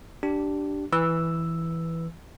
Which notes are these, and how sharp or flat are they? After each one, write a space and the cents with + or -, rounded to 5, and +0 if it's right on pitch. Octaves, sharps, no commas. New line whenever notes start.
D4 +0 G4 -15
E3 +0 B4 +5 E6 +0